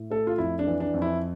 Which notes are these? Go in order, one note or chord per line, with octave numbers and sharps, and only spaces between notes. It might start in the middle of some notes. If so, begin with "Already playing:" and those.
Already playing: A2
A3 A4
F4
F2 E4
D4
E3
D4
F2
E4